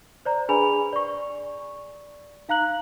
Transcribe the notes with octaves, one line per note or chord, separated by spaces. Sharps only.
C5 D5 A#5
D4 G#4 B4 G#5 B5 F7
D5 C#6
D#4 F5 A#5 F#6 F#7